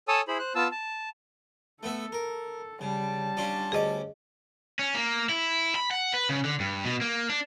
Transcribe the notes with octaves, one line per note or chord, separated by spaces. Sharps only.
A4 C#5 G#5 A5 D#6 E6
E4 G#4 C5 B5
C5 F#6
B3 F4 A5 E6
A5
A3 B3 A4 E5
A#4
C#3 G3 A5
C#4 D4 F4
D2 C#4 G#4 D#5 D6
C#4
A#3
E4
B5
F#5
B4
C#3
D3
G2
B2
A#3
D4